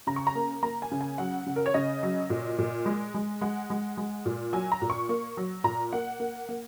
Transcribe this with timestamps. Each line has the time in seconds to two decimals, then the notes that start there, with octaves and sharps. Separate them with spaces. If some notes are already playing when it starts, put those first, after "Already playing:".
0.07 C#3 A#5
0.16 C#6
0.27 A#5
0.35 A#3
0.63 A#3 A#5
0.82 G#5
0.92 C#3
1.01 G#5
1.18 F#3 F#5
1.46 C#3
1.56 A#4
1.66 C#5
1.74 C#3 D#5
2.03 F#3
2.30 A#2
2.58 A#2
2.86 G#3
3.14 G#3
3.41 G#3 F#5
3.70 G#3
3.97 G#3
4.26 A#2
4.53 F#3 G#5
4.72 A#5
4.82 A#2
4.90 C#6
5.09 A#3
5.37 F#3
5.64 A#2 A#5
5.93 A#3 F#5
6.20 A#3
6.49 A#3